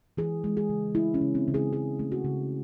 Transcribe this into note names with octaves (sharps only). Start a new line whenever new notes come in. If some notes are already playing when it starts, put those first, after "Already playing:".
E3 G#4
G#3
G#4
C#3
A3 E4
C#4
C#3
C4
C#3
G#4
E3 G#4
A3
F#4
C#3